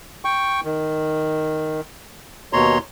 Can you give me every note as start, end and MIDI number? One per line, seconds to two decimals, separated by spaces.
0.25 0.61 79
0.25 0.61 85
0.65 1.81 51
2.53 2.78 39
2.53 2.78 47
2.53 2.78 73
2.53 2.78 82
2.53 2.78 84